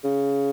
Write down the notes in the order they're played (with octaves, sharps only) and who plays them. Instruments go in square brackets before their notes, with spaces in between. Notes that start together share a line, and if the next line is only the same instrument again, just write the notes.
[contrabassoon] C#3